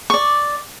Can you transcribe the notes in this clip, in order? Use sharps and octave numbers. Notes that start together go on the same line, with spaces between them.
D5 C#6